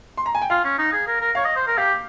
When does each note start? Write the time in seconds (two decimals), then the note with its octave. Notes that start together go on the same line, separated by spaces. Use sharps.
0.17 C6
0.26 A#5
0.35 G#5
0.42 G5
0.50 F4 F5
0.65 C#4
0.78 D#4
0.93 G#4
1.07 A#4
1.21 A#4
1.35 C#5 F5
1.45 D#5
1.56 C5
1.67 A#4
1.78 G4 F5